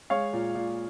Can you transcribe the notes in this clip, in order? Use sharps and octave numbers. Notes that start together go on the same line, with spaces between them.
G#3 C#5 F5
A#2
A#2